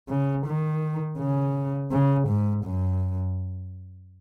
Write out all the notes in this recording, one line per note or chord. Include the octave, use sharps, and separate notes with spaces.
C#3
D#3
C#3
C#3
G#2
F#2